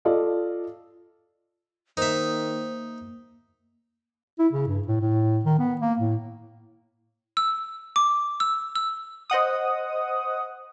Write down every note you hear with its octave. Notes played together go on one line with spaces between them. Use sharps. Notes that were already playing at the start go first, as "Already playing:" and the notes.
F4 A4 D5 D#5 F5
D#3 A#3 D#4 C5 E5
E4
C#3
G2
A2
A2
D#3
B3
A#3
A2
E6
D6
E6
E6
C5 D#5 F#5 D#6